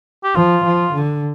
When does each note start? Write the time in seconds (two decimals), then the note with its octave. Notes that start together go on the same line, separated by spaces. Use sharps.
0.24 G4
0.36 F3 F4
0.65 F3
0.94 D3